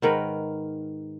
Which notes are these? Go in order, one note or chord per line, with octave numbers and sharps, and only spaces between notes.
G#2 D#3 A#4 B4